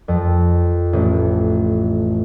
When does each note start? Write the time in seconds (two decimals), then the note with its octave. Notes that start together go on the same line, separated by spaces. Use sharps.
0.08 F2
0.93 A1